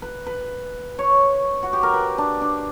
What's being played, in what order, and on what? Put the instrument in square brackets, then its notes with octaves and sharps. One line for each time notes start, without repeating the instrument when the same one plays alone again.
[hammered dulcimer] B4
B4
C#5
F#4
G4
A#4
B4
D4
D4